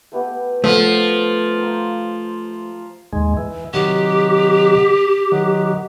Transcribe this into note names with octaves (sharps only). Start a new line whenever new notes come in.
A3 B3 G4
F3 A3 B3
A#4 C5 F5
D#2 G#2 G#3
E3
C3 D#3 F#3 G4
D#3 F#3